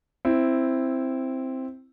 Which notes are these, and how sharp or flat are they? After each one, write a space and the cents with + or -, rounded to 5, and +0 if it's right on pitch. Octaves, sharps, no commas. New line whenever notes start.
C4 +0 E4 +0